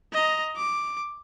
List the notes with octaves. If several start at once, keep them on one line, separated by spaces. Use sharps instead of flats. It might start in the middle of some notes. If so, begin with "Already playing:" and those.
D#5 A#5
D6